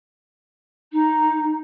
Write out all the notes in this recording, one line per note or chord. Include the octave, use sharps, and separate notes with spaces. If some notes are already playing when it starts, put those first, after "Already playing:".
D#4